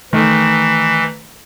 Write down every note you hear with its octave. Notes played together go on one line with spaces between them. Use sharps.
D#3 E3 A3